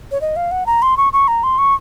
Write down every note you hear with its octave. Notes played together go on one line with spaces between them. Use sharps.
C#5
D#5
F5
F#5
A#5
C6
C#6
C#6
A#5
C6
C#6